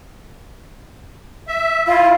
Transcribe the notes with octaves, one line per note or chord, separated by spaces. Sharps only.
E5
E4 F4 F5